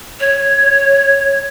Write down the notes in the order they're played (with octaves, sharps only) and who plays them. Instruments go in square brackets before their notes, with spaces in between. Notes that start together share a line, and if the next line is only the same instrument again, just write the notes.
[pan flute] C#5